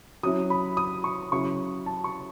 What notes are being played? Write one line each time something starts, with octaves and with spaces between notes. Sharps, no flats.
F#3 C#4 E4 D#6
B5
D#6
C#6
C#3 F#3 C#4 E4 C#6
A5
C#6